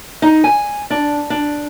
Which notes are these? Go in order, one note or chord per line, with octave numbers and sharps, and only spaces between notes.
D#4
G#5
D4
D4